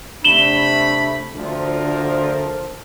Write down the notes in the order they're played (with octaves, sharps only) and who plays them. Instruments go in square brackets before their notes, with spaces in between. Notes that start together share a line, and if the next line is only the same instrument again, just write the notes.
[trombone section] C3 A3 [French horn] D4 [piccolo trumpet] B5 [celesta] E7 F#7 G7
[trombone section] D2 F3 [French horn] D3 [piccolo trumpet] A#4